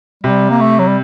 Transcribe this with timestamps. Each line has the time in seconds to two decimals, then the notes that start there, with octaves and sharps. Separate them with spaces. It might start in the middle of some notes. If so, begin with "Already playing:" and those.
0.24 C3 G3
0.50 A#3
0.61 A3
0.79 F#3
0.88 G3